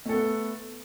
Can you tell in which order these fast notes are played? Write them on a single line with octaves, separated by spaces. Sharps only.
A3 A4 B3